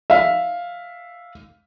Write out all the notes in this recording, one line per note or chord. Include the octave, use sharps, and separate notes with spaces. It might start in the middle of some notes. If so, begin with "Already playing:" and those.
E5 F5